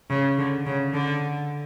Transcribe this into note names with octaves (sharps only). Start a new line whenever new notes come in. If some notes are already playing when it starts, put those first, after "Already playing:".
C#3
D3
C#3
D3